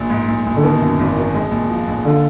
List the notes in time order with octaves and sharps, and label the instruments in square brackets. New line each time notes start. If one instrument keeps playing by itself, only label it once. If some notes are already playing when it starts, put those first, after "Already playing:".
Already playing: [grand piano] A#1
G#2
A#1
A#1
[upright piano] D3
[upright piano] B2 [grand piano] D#3
[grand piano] F#2
G#1
D#3
G#3
A#1
F3
A#1
[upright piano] D3 [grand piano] F4